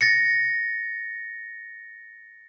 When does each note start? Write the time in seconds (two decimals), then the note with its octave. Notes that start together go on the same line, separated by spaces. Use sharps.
0.01 A6 A#6 C#7